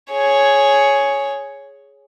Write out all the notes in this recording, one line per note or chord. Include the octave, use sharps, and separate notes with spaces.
G#4 C#5